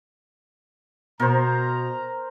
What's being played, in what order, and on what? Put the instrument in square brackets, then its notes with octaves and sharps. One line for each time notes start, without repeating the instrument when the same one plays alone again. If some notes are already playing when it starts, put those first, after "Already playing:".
[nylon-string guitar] B2 [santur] A#4 C5 [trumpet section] A#5